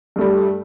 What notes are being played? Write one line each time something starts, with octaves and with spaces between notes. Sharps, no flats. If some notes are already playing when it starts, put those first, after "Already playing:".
G2 G3 A3